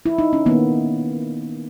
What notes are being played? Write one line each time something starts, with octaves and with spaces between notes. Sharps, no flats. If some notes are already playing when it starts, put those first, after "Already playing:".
E4
D#4
C#4
D#3 A#3 B3